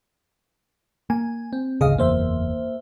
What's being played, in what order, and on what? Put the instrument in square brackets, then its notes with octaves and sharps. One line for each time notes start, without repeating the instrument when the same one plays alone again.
[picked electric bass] A#3 [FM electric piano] G#5
[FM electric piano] C4
[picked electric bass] G#1 D2 C#3 [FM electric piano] G#4 D#5 F5
[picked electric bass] F#1 E2 [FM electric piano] A#3 C5 E5